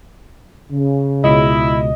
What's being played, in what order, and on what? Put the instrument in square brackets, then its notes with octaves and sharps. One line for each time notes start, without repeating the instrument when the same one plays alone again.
[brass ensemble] C#3
[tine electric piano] C#2 B2 [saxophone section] E4 [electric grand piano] D#5